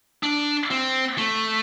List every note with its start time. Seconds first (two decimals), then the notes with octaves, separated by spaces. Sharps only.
0.23 D4
0.71 C4
1.18 A3